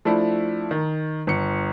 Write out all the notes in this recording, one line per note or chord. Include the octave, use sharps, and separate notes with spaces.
F3 A3 D4 E4
D#3
G1 C#7